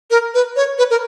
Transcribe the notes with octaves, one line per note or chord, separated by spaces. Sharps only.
A#4
B4
C#5
B4
A#4